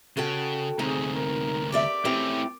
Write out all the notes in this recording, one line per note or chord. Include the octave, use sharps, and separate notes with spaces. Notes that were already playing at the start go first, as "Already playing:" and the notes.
C#3 F#4 A4 G5
D2 C3 C4 D#4 G#4
A#4
G4 D5 E5 D6
A3 C4 C#4 E4 G4